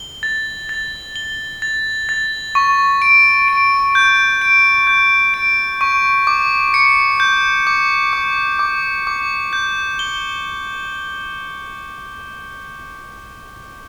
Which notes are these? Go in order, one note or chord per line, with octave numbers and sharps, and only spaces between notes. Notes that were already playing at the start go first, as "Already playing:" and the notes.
Already playing: G7
A6
A6
G7
A6
A6
C#6
D7
D7
G6
D7
G6
D7
C#6
D6
C#7
G6
D6
D6
D6
D6
G6
G7